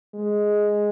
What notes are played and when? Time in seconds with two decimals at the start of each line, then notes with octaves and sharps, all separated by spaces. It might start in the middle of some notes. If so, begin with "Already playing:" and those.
0.14 G#3